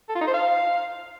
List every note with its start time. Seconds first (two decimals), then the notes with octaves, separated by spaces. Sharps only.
0.09 A4
0.15 F4
0.21 D#4
0.28 C5
0.34 F5